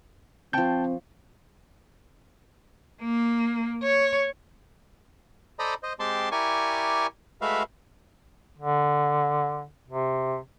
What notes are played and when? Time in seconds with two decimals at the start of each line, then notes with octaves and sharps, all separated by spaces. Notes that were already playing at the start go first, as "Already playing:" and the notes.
0.53 F3 C4 G5 A5 C#6 G6
3.02 A#3
3.83 C#5
5.59 A4 C5 D5 D#5 A#5 B5
5.83 C5 D#5
6.00 G#3 C4 G4 A5 C6
6.32 E4 G4 A#4 D5 G#5 C#6
7.41 G#3 A3 F#4 B4 E5 F5
8.58 D3
9.88 C3